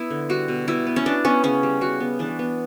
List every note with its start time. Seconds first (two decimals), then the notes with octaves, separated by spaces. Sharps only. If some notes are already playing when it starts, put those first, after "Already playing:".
Already playing: B3 E4
0.10 D3
0.29 G3 F#4
0.48 B2
0.67 B2 E4
0.87 B3
0.96 C#4
1.06 B3 D4
1.24 B3 C#4
1.43 C#3 C#4
1.63 G3
1.81 C#3 F#4
2.00 B3
2.19 E3 D4
2.39 B3